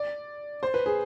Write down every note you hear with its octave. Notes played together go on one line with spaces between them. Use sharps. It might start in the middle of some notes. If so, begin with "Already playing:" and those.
Already playing: D5
C5
B4
G#4